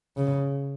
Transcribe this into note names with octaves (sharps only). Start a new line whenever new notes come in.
C#3